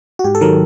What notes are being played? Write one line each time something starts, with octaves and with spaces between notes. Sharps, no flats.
F#4
G#2 G4
A4
D#3 F#3 A#4